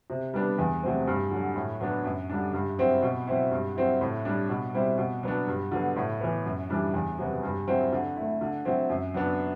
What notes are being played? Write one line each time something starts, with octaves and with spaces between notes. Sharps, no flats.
C3
G3 B3 D4
E2
C3 F#3 A3 C4
G2
D3 F#3
A2
F#3 B3 D4
F#2
D3 G3 D4
G2
F#3 C4 E4
B2
F#3 C4 E4
G2
F#3 C4 E4
A2
G3 D4
B2
G3 C4 E4
B2
F#3 B3 D4
G2
D3 F#3 B3
A2
E3 B3
F#2
E3 G3 D4
E2
C3 F#3 B3
G2
F#3 C4 E4
D3
A3 E4
D3
F#3 C4 E4
F#2
F#3 B3 D4